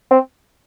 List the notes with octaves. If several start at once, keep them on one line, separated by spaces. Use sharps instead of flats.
C4